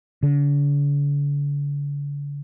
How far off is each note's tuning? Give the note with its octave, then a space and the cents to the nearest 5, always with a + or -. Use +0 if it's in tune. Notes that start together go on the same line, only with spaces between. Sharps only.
D3 -40